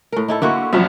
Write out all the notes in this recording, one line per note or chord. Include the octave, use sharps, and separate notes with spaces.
A2 A#4
D#4 E4 A4
D3 A#3 E4 F#4 C#6
C2 F#2 F3 E5